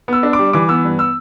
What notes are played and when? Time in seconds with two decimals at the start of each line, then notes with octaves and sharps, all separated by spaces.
0.08 B3 E6
0.23 D4
0.33 D6
0.39 G3
0.53 E3 D6
0.69 B3 E6
0.84 G2
0.99 E6